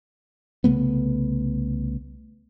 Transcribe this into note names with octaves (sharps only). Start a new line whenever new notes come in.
C2 C#3 A3 B3